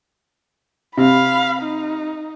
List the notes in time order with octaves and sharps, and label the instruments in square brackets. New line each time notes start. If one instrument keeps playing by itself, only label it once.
[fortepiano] C3 [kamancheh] F5 B5
[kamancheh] D#4